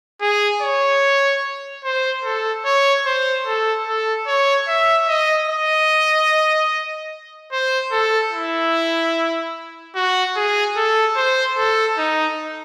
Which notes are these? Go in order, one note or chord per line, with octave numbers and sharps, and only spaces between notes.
G#4
C#5
C5
A4
C#5
C5
A4
A4
C#5
E5
D#5
D#5
C5
A4
E4
F#4
G#4
A4
C5
A4
D#4